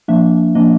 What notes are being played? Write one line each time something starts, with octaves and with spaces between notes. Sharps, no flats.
F3 A#3 D4 E5
F3 A#3 D4 D#5